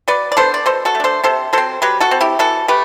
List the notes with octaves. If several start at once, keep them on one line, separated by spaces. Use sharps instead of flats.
F#3 B4 D5
D5
B3 D4 A4 C5
D5
B2 A4 C5
F#4 A4
A3
D4 A4 C5
C3 A4 C5
F#3 C4 A4 C5
F#3 G4 B4
F#4 A4
C4
E4 G4
E3 F#4 A4
A3 G4 B4